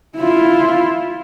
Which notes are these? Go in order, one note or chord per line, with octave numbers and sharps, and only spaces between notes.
E4 F4